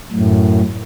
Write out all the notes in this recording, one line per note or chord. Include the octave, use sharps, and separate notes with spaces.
F#2 A2